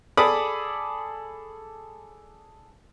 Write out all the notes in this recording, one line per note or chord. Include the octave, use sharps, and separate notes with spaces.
G#4 A4 D5 B5 D6 D#6